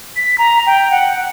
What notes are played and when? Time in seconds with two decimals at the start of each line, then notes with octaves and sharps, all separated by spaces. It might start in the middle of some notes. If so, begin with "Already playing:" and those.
0.16 B6
0.38 A#5
0.67 G5
0.91 F#5